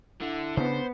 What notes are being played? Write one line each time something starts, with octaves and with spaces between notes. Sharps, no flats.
D3 E4
C#3 B3 C#4 D4 C5